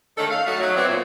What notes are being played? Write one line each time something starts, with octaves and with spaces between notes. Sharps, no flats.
D3 D#3 G#3 A3 C#4 A4
F5
F#3 A3 C#4 D#4 F#4
F#3
B3 C4 E4 F#4 C#5 D5
A#2